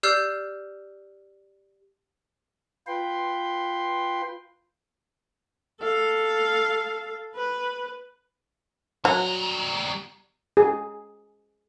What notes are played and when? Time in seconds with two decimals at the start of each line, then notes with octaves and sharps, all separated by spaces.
0.03 G4 D5 E6 F6 G6 C7
2.87 F4 B4 G5 C6
5.81 A4 F5
7.35 B4
9.05 F#3 G3 A#5
10.57 G#4